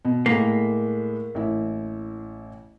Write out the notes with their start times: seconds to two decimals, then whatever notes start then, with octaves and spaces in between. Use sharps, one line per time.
0.05 B2
0.26 A2 G#3 A#3 B6
1.35 A1 E4